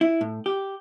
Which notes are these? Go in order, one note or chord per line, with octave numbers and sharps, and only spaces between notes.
E4
A2
G4